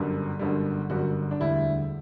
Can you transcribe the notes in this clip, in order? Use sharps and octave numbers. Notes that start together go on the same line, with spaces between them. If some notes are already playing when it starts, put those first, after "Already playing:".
Already playing: G1 F#2 D3 G3
G1 F#2 D3 G3
G1 F#2 D3 G3 F#4
D4
E1 D2 D3 G3 E4